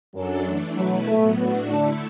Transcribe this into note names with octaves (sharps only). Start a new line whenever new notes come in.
F#2 F#3 D4 A4
E3 A3 D4
B2 F#3 A3 E4 B4
A2 F#3 A3 B3
A2 A3 B3 D4 F#4
D3 A3 D4 E4 A4